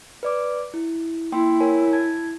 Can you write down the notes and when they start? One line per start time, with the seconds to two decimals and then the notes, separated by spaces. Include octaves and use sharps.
0.23 B4 D5 D6
0.74 E4
1.32 A#3 E4 G5 C6
1.60 A#4 C#5 G#5
1.93 A5 G#6